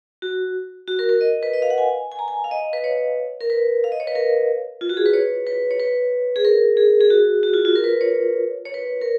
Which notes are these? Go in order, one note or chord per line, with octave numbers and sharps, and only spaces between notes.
F#4
F#4
A#4
A#4
D#5
B4
D#5
F5
F#5
G#5
G#5
A#5
G#5
F5
D#5
B4
C#5
A#4
B4
F5
D#5
C#5
B4
A#4
F4
F#4
G#4
B4
C#5
B4
C#5
B4
G#4
A#4
G#4
G#4
F#4
F#4
F4
F4
A#4
B4
C#5
C#5
B4
A#4